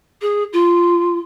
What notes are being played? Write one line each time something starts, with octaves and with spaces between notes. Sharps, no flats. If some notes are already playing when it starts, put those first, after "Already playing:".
G#4
F4